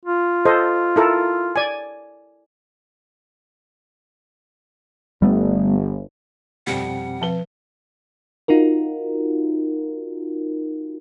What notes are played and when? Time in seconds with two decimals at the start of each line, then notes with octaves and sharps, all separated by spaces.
0.05 F4
0.46 A4 C5 D#5
0.96 E4 A4 A#4
1.56 D5 G#5
5.22 G1 G3 A3 B3
6.67 F2 B2 G3 C4 F#5
7.22 F3 B4 A5 G7
8.48 D#4 F4 F#4 A#4